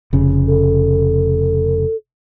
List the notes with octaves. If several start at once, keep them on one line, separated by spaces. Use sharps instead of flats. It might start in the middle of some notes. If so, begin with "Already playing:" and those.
F1 C#3
A4